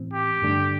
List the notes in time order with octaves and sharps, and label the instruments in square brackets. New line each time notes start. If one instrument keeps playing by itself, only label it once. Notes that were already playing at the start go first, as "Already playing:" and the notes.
Already playing: [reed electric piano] A2 E3 C4
[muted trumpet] G4
[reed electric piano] G2 D3 A3 D4